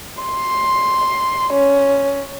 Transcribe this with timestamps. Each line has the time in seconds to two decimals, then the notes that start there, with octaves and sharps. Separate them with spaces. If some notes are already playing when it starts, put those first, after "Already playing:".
0.22 C6
1.54 C#4